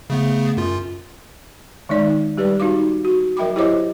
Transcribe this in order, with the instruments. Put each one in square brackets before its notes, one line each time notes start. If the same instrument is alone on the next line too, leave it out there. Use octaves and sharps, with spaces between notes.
[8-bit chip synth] C#3 A3 B3
F#2 F4
[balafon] D#3 G#3 D#4 D5
G3 G4 B4 D5
D#4 F#4 F5 D6
F#4
F#3 A#4 E5 G5 B5 D6
E4 G4 C5 C#5 D#5 D6